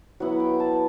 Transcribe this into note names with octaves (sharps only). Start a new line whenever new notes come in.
F#3 B3 E4 F#5
G5
A5